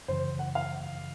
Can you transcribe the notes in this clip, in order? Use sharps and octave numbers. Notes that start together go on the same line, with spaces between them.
F#2 C#3 E3 C5
F#5
F5